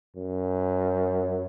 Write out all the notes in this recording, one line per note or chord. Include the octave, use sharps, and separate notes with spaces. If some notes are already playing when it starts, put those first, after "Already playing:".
F#2